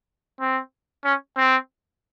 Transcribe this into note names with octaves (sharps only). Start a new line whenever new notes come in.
C4
C#4
C4